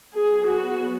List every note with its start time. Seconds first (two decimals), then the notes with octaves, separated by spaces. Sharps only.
0.15 F#3 B3 G#4
0.46 F#4